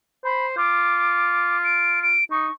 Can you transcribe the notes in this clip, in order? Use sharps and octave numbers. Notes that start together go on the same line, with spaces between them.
C5 B5
F4 D6
D7
D7
D#4 C#6